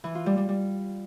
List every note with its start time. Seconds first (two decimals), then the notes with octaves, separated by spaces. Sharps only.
0.04 E3
0.15 F4
0.26 G3
0.37 G3
0.49 G3